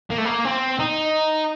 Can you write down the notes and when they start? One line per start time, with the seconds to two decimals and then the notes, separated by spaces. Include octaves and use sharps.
0.10 A#3
0.18 A3
0.25 A#3
0.45 C4
0.79 D#4